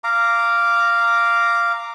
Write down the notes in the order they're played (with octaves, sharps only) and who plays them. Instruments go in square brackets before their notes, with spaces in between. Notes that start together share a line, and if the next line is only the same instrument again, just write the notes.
[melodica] F5 A#5 D6